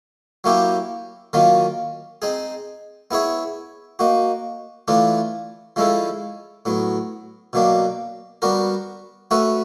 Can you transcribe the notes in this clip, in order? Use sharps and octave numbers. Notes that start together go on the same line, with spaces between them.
F#3 A#3 C#4 E4 G4
D#3 F#3 A#3 C#4 F4
C4 D#4 G#4
B3 E4 G#4 C#5 E5
A#3 D#4 F#4
E3 A3 D4 F4
F3 G#3 C#4 E4 A4
A2 F#3 B3
B2 F#3 A#3 D4
G3 B3 D4 F#4 A#4
A3 C#4 F#4 B4 E5